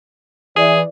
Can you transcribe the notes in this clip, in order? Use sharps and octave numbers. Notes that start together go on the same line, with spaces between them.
E3 G#4 D5